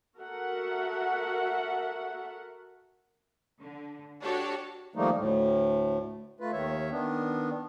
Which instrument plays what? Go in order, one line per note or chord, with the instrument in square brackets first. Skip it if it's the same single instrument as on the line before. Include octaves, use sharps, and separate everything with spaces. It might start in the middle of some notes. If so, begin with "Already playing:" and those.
[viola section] F#4 A4 A#4 E5 F#5
[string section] D3
D4 F#4 G4 A4 C#5
[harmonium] D#3 F3 G3 A3 A#3 D#4
D2 A2
A3 F4 B4
D#2 D#3 C#5 E5
D#3 B3 D4